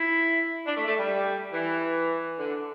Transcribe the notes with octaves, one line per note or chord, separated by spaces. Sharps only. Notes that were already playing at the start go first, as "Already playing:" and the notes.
Already playing: E4
D4
A3
A3
G3
E3
D3